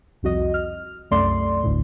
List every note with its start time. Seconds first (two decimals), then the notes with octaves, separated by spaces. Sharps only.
0.23 C2 F2 F#4 D#5
0.54 F6
1.11 C2 F#2 A3 D5 C6
1.63 G1 D2 A2